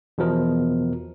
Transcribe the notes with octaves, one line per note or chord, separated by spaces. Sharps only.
E2 B2 F3 A#4